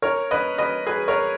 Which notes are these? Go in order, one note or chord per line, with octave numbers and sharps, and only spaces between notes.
A#4 C#5
B4 D#5
B4 D#5
G#4 B4
A#4 C#5